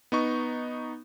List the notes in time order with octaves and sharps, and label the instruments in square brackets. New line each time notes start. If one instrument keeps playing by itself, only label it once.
[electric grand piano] B3 D#4 C#6